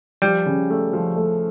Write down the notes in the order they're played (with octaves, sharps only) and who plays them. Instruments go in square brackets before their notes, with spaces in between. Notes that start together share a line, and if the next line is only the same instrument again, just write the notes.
[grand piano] F3 [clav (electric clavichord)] G3
[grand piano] C#3
A3
F3
A3